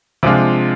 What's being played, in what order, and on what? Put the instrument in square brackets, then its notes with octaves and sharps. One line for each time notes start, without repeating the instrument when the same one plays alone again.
[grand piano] C3 F3 G#3 D4 F4